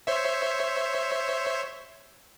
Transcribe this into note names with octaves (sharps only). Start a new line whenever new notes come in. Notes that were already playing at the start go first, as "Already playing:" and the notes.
C5 C#5 E5